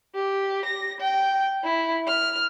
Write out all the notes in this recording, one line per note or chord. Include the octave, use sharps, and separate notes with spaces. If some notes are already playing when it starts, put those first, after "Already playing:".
G4
A#6
G5
E4
F6